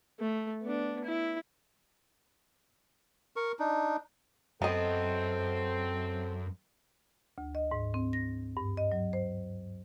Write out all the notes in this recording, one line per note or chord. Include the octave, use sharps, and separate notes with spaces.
A3
B3 D4
E4
A#4 C#6
D4 D#4
F#2 B3 C4 A4 D#5
D2
D#5
G#2
C4
A#6
G2
D#5
F#3
C5